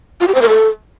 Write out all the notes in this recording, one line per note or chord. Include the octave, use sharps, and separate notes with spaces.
F4
G4
C5
A#4
A4